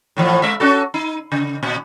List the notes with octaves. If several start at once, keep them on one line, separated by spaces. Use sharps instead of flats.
A2 E3 F3
G#3 E5
C#4 F#4 A4
D#4
C#3
A#2